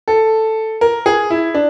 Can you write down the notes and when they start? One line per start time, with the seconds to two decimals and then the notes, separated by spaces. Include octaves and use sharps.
0.08 A4
0.81 A#4
1.06 G#4
1.30 E4
1.54 D4